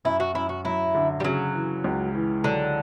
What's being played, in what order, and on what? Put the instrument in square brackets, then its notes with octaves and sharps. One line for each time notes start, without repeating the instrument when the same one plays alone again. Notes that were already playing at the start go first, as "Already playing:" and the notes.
[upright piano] F#2 [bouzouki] E4
[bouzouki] F#4
[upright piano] F#2 [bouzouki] E4
[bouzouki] F#4
[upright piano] F#3 [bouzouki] E4
[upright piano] D3
[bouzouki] G3
[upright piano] C#3 [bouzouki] F#3
[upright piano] E3
C#2
E3
[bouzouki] D3 [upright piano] F#3